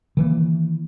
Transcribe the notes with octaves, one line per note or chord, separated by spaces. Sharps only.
D#3 E3 A#3